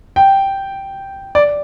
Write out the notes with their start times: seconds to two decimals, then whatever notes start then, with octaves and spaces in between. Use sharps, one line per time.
0.16 G5
1.35 D5